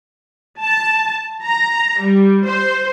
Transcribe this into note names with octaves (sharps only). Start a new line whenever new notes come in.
A5
A#5
G3
C5